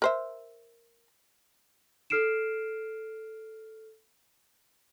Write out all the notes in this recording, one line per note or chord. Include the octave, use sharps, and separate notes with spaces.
A#4 C5 E5
A4 F6 C7 D7 E7